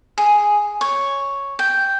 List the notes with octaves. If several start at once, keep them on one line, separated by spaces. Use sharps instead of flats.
G#4
C#5
G5